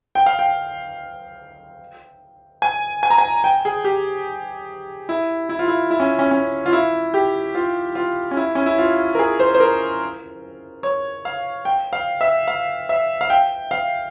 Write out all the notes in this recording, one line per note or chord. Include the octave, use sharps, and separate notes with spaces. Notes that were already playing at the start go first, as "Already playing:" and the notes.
G5
F5
G5
G#5
G#5
A#5
G#5
G5
G#4
G4
E4
E4
F4
E4
E4
C#4
C#4
C#4
F4
E4
G4
F4
F4
C#4
E4
C#4
E4
F4
A#4
G#4
C5
C5
A#4
C#5
F5
G5
F5
E5
F5
E5
F5
G5
F5